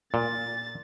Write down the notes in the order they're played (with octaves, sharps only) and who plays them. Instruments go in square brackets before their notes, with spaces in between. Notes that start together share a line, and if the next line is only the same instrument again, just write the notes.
[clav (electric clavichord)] A#2 [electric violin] A6